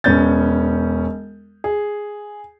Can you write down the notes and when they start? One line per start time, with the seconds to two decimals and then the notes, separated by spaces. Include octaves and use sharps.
0.04 E1 B3 C#4 G6 A6
1.64 G#4